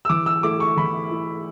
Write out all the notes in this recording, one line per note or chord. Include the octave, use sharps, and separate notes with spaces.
E6
E3 D6
E6
A3 E4 D6
C#6
E3 B5
A3 E4